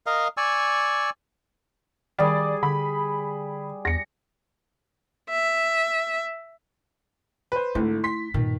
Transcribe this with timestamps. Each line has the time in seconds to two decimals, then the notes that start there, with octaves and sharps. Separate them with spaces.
0.06 A#4 D#5 F5
0.37 D5 G#5 C#6 E6
2.19 D#3 G3 G#4 D5
2.63 D3 B5
3.85 E2 A#6 C#7
5.30 E5
7.52 B4 C5
7.75 G#1 D3 A3 E4
8.04 C6 B6
8.34 G2 A#2 D#3